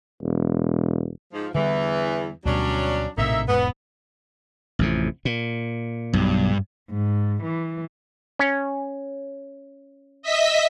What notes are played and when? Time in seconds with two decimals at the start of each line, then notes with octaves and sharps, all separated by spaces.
0.22 E1
1.33 G#2 F3
1.55 E2 D3 E3 G3
2.45 D2 B2 F#3 G3 C#4 D4
3.18 A#1 A2 C3 A#3 D#4 E5
3.48 E1 G#2 B3
4.79 A1 F2 C3
5.25 A#2
6.13 B1 G2
6.90 G#2
7.43 E3
8.39 C#4
10.22 D#5 E5 B6